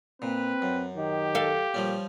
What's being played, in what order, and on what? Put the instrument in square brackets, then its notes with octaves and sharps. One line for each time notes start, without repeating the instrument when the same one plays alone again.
[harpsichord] A#2 [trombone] C4 [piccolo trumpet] B4
[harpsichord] F#2
[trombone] D#3 [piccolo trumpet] G4
[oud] A4 F5
[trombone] A#2 [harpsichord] F3 G3 C#4